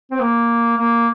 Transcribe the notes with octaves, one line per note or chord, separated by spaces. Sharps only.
C4
A#3
A#3